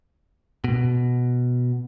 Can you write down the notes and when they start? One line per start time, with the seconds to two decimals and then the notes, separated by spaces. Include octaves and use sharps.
0.64 B2